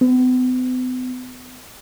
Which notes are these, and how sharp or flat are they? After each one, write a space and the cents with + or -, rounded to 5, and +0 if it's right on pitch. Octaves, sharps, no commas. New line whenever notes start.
B3 +45